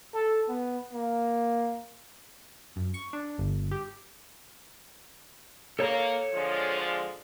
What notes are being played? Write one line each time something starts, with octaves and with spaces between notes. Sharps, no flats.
A4
B3
A#3
F#2
C#6
D4
G1
G4
A#3 A4 C#5
D3 F3 G#3